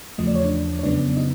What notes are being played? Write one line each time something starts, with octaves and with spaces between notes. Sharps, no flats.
E2 C#3 F3 A3 D#5
D5
C#5
D4 D5
C#5
F2 C#3 F#3 B3 D4 D5
D#4 D#5